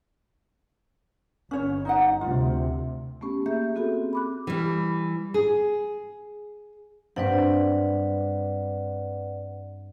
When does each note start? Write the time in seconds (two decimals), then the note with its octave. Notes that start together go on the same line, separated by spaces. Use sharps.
1.51 G1 C#4 C#5
1.85 D#4 D#5 F#5
2.21 D2 C3 F4
3.21 A3 B3 C#4 G4
3.46 A#3 G#4 E5 G6
3.75 B3 C4 F#4 G#4 A4
4.13 B5 D6 F#6
4.47 E3 G3
5.34 G#4
7.16 G2 C4 B4 D5 F#5